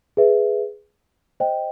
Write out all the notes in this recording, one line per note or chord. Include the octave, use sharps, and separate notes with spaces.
G#4 B4 E5
C5 D#5 G5